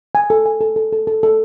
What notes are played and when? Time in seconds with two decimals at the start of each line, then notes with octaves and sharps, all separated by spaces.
0.15 G#5
0.30 A4
0.46 G#5
0.61 A4
0.76 A4
0.92 A4
1.07 A4
1.23 A4